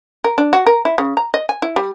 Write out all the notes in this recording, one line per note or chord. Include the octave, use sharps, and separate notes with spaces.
A#4
D4
F#4
A#4
E4
C#3
A#5
D#5
G#5
E4
G3